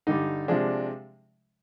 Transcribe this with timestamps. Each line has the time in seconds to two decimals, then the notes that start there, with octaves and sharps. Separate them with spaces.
0.07 G2 D3 G3 D#4
0.48 C3 F3 G#3 D4